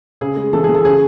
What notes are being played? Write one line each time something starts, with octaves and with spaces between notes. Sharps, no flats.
C#3 G#4
G#3
E3 A4
G#4
E3
A4
C#3 G#4